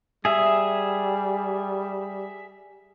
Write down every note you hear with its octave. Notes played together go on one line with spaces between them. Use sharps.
G3 G#4 E5